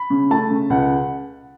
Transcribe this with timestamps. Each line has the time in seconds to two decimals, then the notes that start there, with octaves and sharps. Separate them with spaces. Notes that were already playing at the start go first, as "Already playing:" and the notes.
Already playing: B5
0.10 C#3
0.30 A3 A5
0.50 C#3
0.70 C#2 F#5